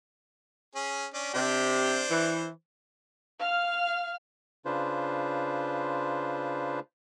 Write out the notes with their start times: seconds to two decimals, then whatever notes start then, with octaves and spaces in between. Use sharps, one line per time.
0.75 C#4 G#4
1.14 C#4 D4
1.34 C3 D4 G4 C5
2.11 E3
3.39 F5 F6
4.65 C#3 D4 F4 B4 C5